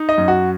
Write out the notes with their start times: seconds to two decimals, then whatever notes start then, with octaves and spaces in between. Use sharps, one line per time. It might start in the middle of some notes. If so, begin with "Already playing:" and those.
Already playing: D#4
0.09 D#5
0.18 F#2
0.28 F#4